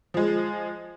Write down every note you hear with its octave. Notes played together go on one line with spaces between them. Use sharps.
F3 G#3